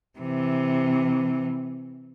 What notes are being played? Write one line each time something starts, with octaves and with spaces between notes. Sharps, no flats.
C3 E3